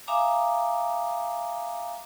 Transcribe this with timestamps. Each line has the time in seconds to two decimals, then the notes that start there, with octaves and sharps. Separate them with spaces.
0.07 E5 F5 G#5 A#5 D6 D#6